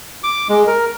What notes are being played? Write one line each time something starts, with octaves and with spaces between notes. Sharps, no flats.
D6
G#3
A#4